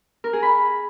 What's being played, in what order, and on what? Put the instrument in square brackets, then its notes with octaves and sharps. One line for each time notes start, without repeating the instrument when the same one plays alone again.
[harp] A#4
G#4
B5